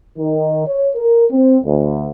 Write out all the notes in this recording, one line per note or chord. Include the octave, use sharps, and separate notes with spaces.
D#3
C#5
A#4
C4
D2